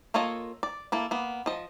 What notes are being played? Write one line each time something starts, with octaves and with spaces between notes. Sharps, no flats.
A#3 F4 A4 C#5 D#5
D5
A#3 E4 A4
A#3 B3
F3 D#5